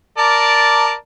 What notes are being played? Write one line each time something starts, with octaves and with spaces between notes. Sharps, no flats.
A#4 D5 A5